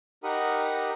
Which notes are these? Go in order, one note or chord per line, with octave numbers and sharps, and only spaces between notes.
D#4 G4 A#4 F#5 B5 D#6